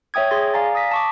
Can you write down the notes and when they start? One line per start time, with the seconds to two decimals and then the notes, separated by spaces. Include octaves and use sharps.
0.14 C#5 E5 G5 D#6 G#6
0.31 G#4 C6 A6 A#6
0.54 D5 F5 G#5 A#5 A6
0.75 D#6 A#6 B6
0.91 A5 C#6 D6